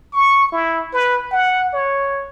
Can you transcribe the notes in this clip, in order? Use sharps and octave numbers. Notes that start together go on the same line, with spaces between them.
C#6
E4
B4
F#5
C#5